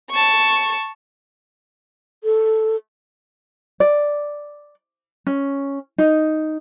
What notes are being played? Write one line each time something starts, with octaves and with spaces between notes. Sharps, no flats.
A5 C#6
A4
D5
C#4
D#4